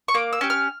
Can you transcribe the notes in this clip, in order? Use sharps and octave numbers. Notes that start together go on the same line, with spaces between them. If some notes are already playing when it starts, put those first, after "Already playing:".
C#6
A#3 D6
E6
C#4 G4
F6